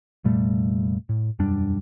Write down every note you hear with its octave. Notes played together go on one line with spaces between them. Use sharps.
F1 A#2 G3 A3
A2
E1 F#2 G3 D4